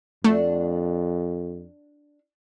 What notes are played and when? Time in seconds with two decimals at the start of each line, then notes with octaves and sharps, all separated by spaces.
0.24 F2 A3 D4 F#4